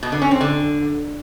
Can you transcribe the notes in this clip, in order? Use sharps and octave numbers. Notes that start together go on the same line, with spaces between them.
B2
D3
C#4
C4
D3